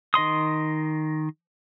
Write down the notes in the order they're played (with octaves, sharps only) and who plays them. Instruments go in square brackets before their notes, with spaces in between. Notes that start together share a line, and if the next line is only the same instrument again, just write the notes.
[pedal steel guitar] D#3 D#5 C6 D#6